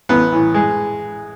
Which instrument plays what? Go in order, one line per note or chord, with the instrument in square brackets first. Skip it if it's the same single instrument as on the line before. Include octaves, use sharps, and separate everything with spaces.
[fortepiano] A1 B3
A2 E3
G#3